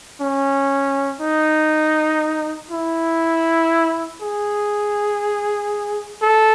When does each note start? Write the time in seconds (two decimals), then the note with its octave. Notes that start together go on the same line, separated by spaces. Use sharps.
0.21 C#4
1.21 D#4
2.71 E4
4.22 G#4
6.22 A4